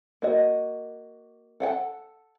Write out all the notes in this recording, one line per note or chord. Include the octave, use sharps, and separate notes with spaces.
A#3 F#4 D#5
A4 F#5 G5 A5